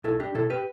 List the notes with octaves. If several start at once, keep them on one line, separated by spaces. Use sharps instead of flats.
B1 E4 A4
D4 G4
B2 E4 A4
G4 B4